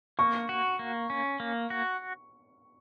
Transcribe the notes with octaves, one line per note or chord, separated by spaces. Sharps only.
A#3 C#6
F#4
A#3
C#4
A#3
F#4